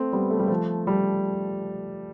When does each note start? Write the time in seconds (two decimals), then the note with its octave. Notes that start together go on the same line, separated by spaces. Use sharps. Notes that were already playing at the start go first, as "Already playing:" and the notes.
Already playing: A3 C4
0.13 G3 B3
0.31 A3
0.39 G3
0.48 F3 A3
0.87 G3